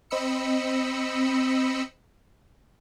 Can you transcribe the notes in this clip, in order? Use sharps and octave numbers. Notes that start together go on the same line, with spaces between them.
C4 D#5 B5 E6 C#7